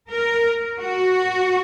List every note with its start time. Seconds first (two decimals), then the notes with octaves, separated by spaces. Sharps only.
0.11 A#4
0.80 F#4